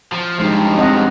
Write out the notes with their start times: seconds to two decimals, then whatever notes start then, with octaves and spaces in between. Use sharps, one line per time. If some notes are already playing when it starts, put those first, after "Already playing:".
0.12 F3
0.39 G2 F3 G#3 D#4
0.77 C4 D#5 F#5